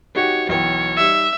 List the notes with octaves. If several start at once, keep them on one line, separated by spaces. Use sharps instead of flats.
D#4 F#4 G4 C#5
B1 E3 C#5 G5
G3 D#4 E5